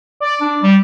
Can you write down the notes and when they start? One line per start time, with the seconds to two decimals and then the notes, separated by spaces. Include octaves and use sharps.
0.20 D5
0.41 D4
0.62 G3